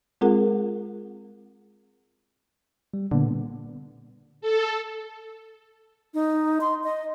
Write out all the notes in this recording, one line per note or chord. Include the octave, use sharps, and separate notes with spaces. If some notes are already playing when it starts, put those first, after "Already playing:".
G#3 C4 F4 G#4 A#4 F#5
G3
A#2 D3 A#3 B3
A4
D#4
C6
D#5